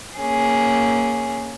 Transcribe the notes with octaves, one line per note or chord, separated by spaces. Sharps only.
A#3 C#4 G#4